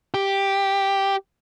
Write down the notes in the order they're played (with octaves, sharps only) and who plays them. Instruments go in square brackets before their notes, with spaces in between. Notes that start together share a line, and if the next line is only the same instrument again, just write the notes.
[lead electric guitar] G4